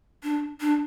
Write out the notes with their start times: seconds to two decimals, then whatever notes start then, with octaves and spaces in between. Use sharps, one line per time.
0.23 D4
0.61 D4